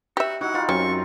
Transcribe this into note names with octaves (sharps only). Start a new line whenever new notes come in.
F#4 G4 E5
F#3 D#4 E4 F#5
G3 D#4 F4
F#2 F#3 C4 C#4 C#6